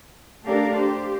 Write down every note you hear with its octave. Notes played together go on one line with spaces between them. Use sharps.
A3 D4 G4 A4 A#4 F5
G4 C5